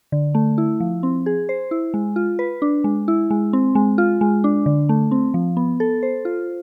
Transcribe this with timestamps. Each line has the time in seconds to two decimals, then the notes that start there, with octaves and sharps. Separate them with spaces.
0.12 D3
0.35 A3
0.58 E4
0.80 F3
1.03 C4
1.26 G#4
1.49 C5
1.71 E4
1.94 G#3
2.16 F4
2.39 B4
2.62 D4
2.84 G#3
3.08 E4
3.31 G#3
3.53 C4
3.75 G#3
3.98 F4
4.21 G#3
4.44 D4
4.66 D3
4.89 A3
5.11 C4
5.34 F3
5.57 B3
5.80 A4
6.03 C5
6.25 F4